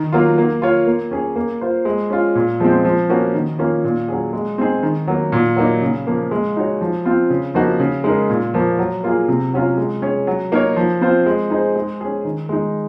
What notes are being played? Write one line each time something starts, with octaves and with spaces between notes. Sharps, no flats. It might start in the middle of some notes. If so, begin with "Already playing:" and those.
Already playing: D#3
F#3 A#3 F4
A#3
F4 A#4 C#5
A#3
C#4 G#4 C#5
A#3
F4 C5
G#3
C#4 F4
A#2
F3 G#3 C4
F3
A#3 C#4 F#4
D#3
A#3 C#4 F4
A#2
F#3 C#4 G#4
G#3
C4 D#4 G#4
D#3
F#3 A#3
A#2
F#3 A#3 D#4
C#3
F3 A#3
G#3
D#4 F#4 C#5
F3
C4 F4
C#3
F3 A#3 D#4 F#4
C#3
G#3 D#4 A#4
A#2
F3 A#3
F#3
A#3 F4 G#4
C3
F#3 C#4 F4
G#3
C#4 G#4 C#5
F#3
A#3 D#4 A#4 C#5
F3
C4 F4 C5
G#3
D#4 G#4 C5
G#3
C#4 G#4
D#3
G#3 D#4